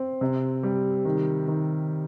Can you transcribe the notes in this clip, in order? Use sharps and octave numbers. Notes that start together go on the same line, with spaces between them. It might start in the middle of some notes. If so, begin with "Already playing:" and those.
Already playing: C4
C3
G3
D#3
D#3